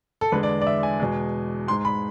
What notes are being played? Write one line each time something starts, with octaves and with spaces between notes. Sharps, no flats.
A4
E2 D3 G#3 B4
D5
D5
E5
G#5
E2 B2 G#3
G#2 G#3 C6
B5